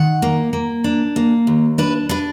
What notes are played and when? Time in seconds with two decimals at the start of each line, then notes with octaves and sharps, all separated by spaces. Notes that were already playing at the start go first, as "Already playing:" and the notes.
Already playing: D#3 F#5
0.22 A#3
0.53 A#3
0.84 D4
1.16 A#3
1.47 D#2
1.78 D4 B4
2.09 D4 B4